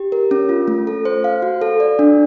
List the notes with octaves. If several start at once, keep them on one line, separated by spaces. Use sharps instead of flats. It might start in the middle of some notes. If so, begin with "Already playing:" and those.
Already playing: G4
A#4
C#4
F4
A3
A4
C5
F5
F#4
A4
D5
D4